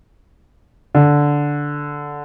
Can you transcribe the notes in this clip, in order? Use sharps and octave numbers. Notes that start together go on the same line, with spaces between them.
D3